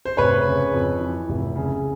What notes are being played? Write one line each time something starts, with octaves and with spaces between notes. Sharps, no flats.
C5
F1 B4 C#5
C#3
F2
E3
F1
C#3